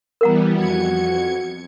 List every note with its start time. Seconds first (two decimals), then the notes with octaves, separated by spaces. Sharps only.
0.21 E3 G3 B3 A#4 F#5 A#5
0.56 F2 F#4 G#6 C#7